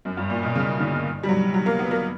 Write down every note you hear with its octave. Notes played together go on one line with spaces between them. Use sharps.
F#2
G2
A#2
B2
C#3
D3
G3
F#3
F#3
A#3
B3
A#3